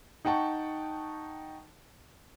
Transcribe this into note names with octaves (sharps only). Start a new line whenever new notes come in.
D#4 F#5 G5 A5 C#6